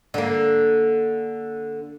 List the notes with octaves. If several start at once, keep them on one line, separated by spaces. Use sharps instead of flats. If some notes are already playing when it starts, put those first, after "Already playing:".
D3 A#3